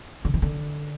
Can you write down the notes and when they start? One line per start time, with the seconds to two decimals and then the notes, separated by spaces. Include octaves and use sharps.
0.25 D3
0.34 D#3
0.42 D3